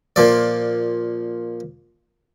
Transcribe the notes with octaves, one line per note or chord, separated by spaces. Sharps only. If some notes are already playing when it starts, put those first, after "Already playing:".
A#2 F3 D5